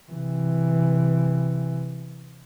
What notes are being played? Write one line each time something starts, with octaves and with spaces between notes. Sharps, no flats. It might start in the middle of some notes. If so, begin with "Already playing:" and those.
C3 E3